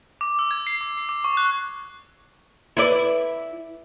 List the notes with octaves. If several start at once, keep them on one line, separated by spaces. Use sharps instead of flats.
D6
E6
G#6
C7
D6
C7
D6
C#6
F#6
E4 B4 D5